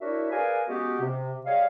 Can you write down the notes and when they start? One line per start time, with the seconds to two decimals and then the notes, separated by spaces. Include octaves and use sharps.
0.01 D4 E4 F#4 A#4 C#5 E5
0.32 G#4 A#4 B4 D5 F5 G#5
0.68 G#3 B3 C#4 F#4 G4
1.01 C3
1.46 G3 G#4 C#5 D#5 F5